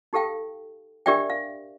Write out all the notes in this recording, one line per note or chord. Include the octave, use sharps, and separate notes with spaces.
D#4 G4 A4 F5 G5
D4 G4 A#4 D5 E5 G5
F5